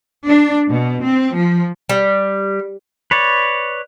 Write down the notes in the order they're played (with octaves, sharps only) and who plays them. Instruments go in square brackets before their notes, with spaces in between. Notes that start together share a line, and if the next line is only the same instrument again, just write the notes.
[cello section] D4
B2
C4
F3
[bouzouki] G3
[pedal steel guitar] B4 C#5 D5